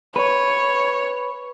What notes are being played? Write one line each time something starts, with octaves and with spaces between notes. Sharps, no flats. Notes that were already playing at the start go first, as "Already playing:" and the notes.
B4 C#5